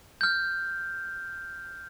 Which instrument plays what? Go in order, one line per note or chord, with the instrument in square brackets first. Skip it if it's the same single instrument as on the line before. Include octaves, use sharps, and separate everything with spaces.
[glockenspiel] F6 G6